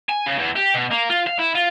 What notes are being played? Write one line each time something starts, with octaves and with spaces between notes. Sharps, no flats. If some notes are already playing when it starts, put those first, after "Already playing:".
G#5
C#3
E2
G4
B2
A#3
F4
F5
E4
F4